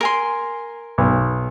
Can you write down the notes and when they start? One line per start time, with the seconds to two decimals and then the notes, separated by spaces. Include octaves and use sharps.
0.01 A#4 G#5 C6
0.98 B1